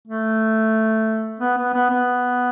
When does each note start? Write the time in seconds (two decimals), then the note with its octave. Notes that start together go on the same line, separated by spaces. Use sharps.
0.07 A3
1.40 B3
1.57 B3
1.74 B3
1.90 B3